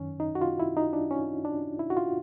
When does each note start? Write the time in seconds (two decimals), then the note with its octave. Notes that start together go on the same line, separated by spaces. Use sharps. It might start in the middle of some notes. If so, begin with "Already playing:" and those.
Already playing: F#2 D#3 C#4
0.20 D#4
0.35 F#4
0.41 F4
0.60 E4
0.77 D#4
0.93 D4
1.11 C#4
1.45 D4
1.79 E4
1.90 F#4
1.97 F4